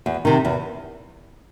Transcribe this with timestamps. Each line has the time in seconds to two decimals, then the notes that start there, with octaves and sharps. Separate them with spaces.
0.06 E2
0.25 C3 D#3
0.45 E2